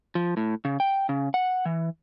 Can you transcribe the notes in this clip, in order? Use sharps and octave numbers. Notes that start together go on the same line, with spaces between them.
F3
A2
C#3
G5
C#3
F#5
E3